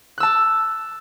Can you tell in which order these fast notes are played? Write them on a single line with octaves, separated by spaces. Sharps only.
F#6 E6 A5